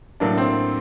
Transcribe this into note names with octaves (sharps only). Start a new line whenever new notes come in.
A2 F#3 A#3 D4
C4